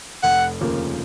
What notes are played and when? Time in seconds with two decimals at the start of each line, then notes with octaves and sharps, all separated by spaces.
0.23 F1 F#5
0.61 D#2 C#3 F3 A#3